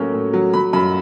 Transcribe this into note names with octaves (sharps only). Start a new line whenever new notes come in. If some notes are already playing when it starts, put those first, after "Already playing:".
Already playing: A2 F#3 A#3 C#4
A2
F#3
F#3 B5
F#2 B5